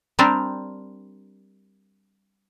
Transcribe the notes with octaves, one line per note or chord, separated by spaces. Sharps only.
G3 C4 D4 G4 A#4 D5